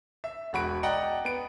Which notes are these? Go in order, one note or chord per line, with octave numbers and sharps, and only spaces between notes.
E5
E1 F#4 B5 D7
D5 D#5 F#5 G5 A#5
B3 D7